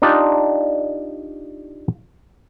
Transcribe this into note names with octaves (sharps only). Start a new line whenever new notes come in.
D4 D#4 F4 G4 D5